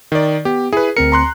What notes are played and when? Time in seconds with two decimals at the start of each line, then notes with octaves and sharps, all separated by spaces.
0.12 D#3 D5
0.45 B3 G4
0.73 E4 G#4 B4
0.97 D2 C4 A#4 C#7
1.12 A#5 C6 F#6